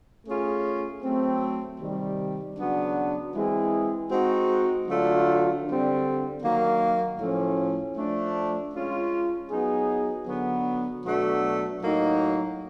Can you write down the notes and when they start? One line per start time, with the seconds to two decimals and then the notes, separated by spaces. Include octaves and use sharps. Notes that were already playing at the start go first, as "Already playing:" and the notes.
0.25 A3 C#4 F4 G#4
1.02 F#3 A3 C4
1.79 C3 D#3 G3
2.56 C#3 F#3 B3 D4
3.34 E3 G#3 C4 E4 G#4
4.10 G#3 C4 D#4 F#4
4.88 D3 F#3 A3 D4 F4
5.64 D3 G3 C4
6.42 D#3 F#3 A#3
7.18 A2 F3 A3 C#4
7.96 F3 A3 D4
8.73 G#3 C#4 F4
9.50 F#3 B3 D#4 G#4
10.27 D3 F#3 B3
11.04 B2 F#3 A3 D4 F#4
11.81 A2 F#3 A#3 D#4